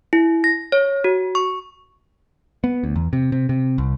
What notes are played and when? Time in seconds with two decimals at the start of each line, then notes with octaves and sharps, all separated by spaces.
0.13 E4
0.44 A#6
0.72 C#5
1.04 F#4
1.35 C#6
2.64 B3
2.84 D2
2.96 E2
3.13 C3
3.32 C3
3.49 C3
3.78 C2